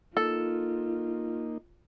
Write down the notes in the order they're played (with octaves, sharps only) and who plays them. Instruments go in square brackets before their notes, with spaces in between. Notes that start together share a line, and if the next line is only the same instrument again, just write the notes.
[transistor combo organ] A#3 D#4 [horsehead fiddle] F4 [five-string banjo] A4